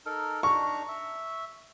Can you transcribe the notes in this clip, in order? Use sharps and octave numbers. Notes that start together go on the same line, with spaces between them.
D#4 A4 A#4
D4 D#4 A#5 C#6
E5